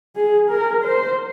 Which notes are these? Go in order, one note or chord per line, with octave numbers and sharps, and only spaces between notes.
G#4
A#4
C5